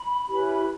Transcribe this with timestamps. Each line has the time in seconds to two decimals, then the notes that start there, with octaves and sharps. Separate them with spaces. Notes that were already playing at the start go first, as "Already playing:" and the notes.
Already playing: B5
0.27 C#4 E4 G4 B4